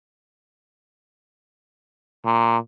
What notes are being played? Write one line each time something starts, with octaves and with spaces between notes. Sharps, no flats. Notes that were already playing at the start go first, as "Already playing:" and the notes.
A#2